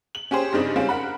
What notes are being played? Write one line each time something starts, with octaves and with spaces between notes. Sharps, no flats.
F#7
C#4 G4 G#4 C5
G2 C#3 C4 D4 D#4
G3 G#3 C4 C#4 F4
A#4 F#5 B5